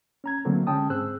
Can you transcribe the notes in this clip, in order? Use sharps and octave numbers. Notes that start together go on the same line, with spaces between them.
C#4 A#5 G#6
D3 F#3 A3 A#3 C4
D3 G#3 C#4 G5 A5 D#6
G#2 C4 G#4 C5 E6 F#6